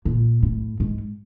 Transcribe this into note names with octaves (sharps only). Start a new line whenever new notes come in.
A#2
A2
G#2